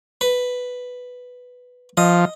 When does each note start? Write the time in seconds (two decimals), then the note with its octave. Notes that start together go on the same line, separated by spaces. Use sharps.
0.21 B4
1.97 F3 D#5